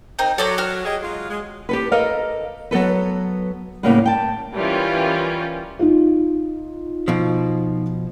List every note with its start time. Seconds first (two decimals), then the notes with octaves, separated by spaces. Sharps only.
0.19 C4 D#4 A#4
0.38 F#3 A4 D5 A#5
0.58 F#4 F6
0.84 G4 G#4 D#5
1.01 F#3 G#3 F4
1.30 G#3
1.69 G4 A4 B4
1.92 A4 A#4 D#5 F5
2.71 F#3 B3 A4 B4
3.83 A2 C#3 G3 A#3 B3 B4
4.05 G5 A5
4.55 E3 G3 C#4 F4 A#4 G5
5.79 D#4 F4
7.08 B2 F3